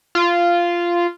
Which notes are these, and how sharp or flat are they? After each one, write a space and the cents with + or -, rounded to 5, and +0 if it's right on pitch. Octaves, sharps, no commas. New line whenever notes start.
F4 -10